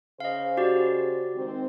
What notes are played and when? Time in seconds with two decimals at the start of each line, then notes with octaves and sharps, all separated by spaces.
0.20 C#3 G#4 C5 D#5 F5
0.57 F#4 G4 D5
1.35 D#3 G#3 C4